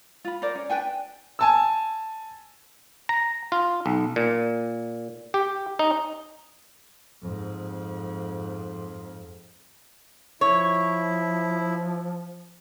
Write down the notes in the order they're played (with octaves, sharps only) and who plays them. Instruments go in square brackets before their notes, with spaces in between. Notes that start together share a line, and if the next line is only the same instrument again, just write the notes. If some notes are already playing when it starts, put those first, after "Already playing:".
[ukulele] F4 B5
A#4 C5 D5
C#4
D4 B4 G5 G#5
[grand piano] G#5 A5 E6
[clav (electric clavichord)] A#5
F4
B1
A#2
G4
D#4
[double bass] F2 G#2
[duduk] F3 [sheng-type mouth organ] E4 [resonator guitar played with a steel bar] C#5